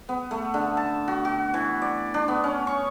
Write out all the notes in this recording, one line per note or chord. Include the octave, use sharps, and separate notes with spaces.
B3
A3
D3
A5
F#4
F#4
E3
D5
D4
B3
C#4
C#6